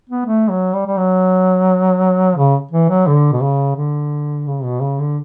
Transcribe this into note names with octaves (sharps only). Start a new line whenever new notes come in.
B3
A3
F#3
G3
G3
F#3
C#3
E3
F#3
D3
B2
C#3
D3
C#3
B2
C#3
D3